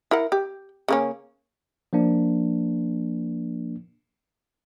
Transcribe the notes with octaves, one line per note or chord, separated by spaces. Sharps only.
E4 A#4 F#5
G4
C#3 A#3 C#4
F3 A#3 D4